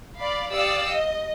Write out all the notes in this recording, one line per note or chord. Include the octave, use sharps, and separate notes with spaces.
D5 F5 B5
G4 D5 F5 D#6 E6 C#7
D#5